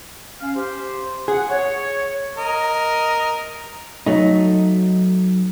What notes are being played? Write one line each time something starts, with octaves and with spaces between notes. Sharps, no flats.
C#4 F5
G4 C5
G#4 F#5
C#5
A#4 D#5
F#3 A3 D#4